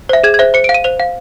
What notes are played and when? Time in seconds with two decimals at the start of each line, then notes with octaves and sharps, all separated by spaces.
0.09 C5 E5
0.24 G#4 G#6
0.34 G#6
0.39 C5 E5
0.54 C5 C#7
0.64 D7
0.69 F5
0.74 D#7
0.84 C5 F7
1.00 F5